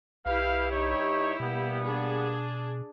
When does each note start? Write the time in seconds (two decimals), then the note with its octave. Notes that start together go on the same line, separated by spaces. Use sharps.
0.26 B1 E4 G4 B4 F5
0.71 G2 D#4 C#5
1.40 B2 G3 A#3 B3
1.84 D4 G#4